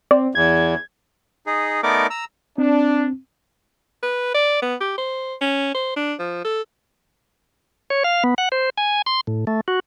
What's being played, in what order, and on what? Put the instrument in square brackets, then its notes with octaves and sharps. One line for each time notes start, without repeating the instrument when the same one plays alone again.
[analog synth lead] C4 [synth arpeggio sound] D5
[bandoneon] E2 [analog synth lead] G#6
[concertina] D#4 G#4
A3 B3 D#4 A#4 D5 D6
A#5 E6
[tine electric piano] C4 [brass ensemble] D4
[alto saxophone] B4
D5
B3
G4
C5
C#4
C5
D4
F3
A4
[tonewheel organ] C#5
F5
B3
F#5
C5
G#5
C6
A2
A3
F#4